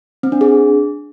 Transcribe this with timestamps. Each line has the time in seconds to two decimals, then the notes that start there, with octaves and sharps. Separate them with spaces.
0.23 C4
0.32 D4
0.41 G#4